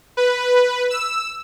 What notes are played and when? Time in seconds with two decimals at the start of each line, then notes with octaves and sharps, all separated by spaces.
0.17 B4
0.90 E6